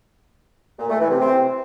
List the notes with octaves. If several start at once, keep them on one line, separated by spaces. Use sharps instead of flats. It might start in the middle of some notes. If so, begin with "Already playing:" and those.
A#2
A3
E3
C3
C4